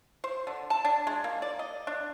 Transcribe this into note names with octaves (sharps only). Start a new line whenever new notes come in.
C5
D3
A5
D4
G#3
A#3
D5
D#5
D4